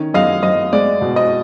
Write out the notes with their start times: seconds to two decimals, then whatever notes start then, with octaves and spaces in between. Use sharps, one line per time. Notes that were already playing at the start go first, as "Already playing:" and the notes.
Already playing: D#3 C#4
0.14 F#2 D#5 F5
0.43 F#2 D#5
0.73 G#3 D5
1.01 B2
1.16 D#5